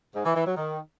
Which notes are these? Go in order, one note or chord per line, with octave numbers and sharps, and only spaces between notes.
G#2
E3
E3
F#3
D#3